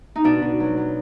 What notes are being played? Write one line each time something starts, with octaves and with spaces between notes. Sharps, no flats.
D#4
B2 D4
B2
F#3
F#3